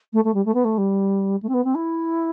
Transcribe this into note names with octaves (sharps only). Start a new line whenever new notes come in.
A3
A3
G3
A3
B3
A3
G3
A3
C4
B3
C4
E4